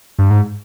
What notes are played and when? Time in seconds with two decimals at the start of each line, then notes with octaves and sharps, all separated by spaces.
0.19 G2
0.30 G#2